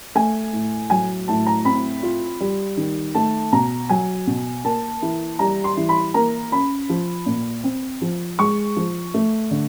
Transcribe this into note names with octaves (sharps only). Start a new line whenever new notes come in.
A3 G#5
A2
F#3 G#5
A2 A5
A#5
C4 B5
F4
G3
D#3
A3 A5
B2 A#5
F#3 G#5
B2
A#3 A5
E3
G3 A#5
C6
E3
B5
A#3 A#5
C#4 B5
F3
A#2
C4
F3
G#3 C#6
F3
A3
D3